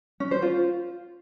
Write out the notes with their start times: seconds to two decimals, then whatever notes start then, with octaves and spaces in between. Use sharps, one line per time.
0.20 C#4
0.31 C5
0.42 F4